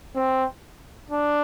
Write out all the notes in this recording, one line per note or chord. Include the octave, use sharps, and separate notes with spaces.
C4
D4